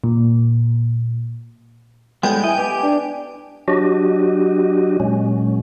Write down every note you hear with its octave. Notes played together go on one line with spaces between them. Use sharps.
A#2
A2 G3 G#3 B3 G5 G#5
E4 D#5
B3 G4
D4
F#3 D4 F#4 G4 D#5
A#2 F#3 G#3 C#4